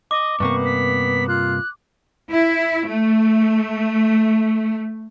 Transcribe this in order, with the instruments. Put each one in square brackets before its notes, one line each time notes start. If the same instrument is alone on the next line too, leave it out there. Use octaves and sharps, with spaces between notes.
[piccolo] D#5 [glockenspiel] D6
[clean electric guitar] G2 C3 A#3 [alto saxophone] B3 [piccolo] C#6
[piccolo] B6
[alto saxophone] F4 [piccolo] F#6
[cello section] E4
A3